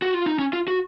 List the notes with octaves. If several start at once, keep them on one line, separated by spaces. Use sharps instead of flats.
F#4
F4
D#4
C#4
F4
F#4